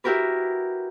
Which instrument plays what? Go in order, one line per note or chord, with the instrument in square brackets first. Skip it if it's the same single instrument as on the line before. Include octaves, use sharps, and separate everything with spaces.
[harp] E4 F#4 G4 A#4 B4